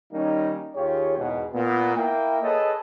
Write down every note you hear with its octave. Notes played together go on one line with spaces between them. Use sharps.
D#3 G3 A#3 C#4 D#4
D#2 F4 G4 G#4 C#5
E2 G#2 B2
A#2 B3
A#3 E4 G5
G#4 A4 B4 C#5 D#5 A5